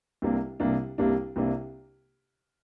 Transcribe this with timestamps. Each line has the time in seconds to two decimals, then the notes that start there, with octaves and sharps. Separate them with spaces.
0.22 C2 C3 G3 A#3 D4
0.60 C2 C3 G3 A#3 D4
0.98 C2 C3 G3 A#3 D4
1.36 C2 C3 G3 A#3 D4